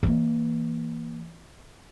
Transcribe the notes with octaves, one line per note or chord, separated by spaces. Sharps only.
E3 A#3